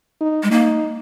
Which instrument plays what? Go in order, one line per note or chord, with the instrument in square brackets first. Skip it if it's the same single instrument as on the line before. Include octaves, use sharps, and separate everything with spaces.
[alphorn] D#4
[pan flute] G#3
[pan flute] A#3 [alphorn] D#4